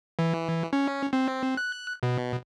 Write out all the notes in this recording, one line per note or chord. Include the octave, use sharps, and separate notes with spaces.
E3
C#4
C4
F#6
B2